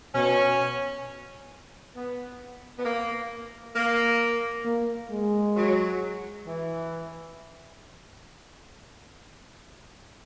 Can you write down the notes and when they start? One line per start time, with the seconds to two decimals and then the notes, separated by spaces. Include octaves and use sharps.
0.15 B2 C#4
1.96 B3
2.78 B3
2.85 A#3
3.76 A#3
4.65 A#3
5.11 G#3
5.56 F#3
6.47 E3